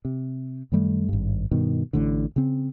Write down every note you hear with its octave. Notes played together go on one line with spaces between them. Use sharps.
C3
F#2 D#3 G3 A3
G#1 G2
G2 B2 D#3
A1 A2 D3
C#3 C4